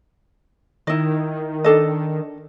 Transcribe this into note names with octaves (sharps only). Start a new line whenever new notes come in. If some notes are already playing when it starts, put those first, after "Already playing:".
D#3 E4 D#5
D4 A4 D#5